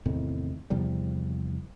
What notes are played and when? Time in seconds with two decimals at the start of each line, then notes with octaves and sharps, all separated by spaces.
0.05 E2 A2 C3 D#3
0.70 E2 C3 F3 G3